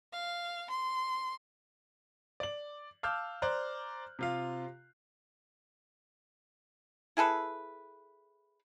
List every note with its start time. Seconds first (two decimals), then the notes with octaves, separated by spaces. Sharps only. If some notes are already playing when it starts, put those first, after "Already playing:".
0.13 F5
0.71 C6
2.40 D5 F#7
3.03 F5 A5 D6 E6 F6 G6
3.42 C5 D5 A#5 D6 F#6
4.19 C3 F4 F5
7.17 E4 G#4 A4 B4